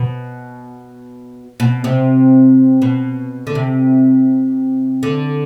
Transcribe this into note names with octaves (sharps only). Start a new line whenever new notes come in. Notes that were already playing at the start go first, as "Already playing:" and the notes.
Already playing: B2
B2
C3
B2
D3
C3
D3